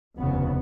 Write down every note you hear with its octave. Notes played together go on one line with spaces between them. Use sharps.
F1 D#2 C#3 B3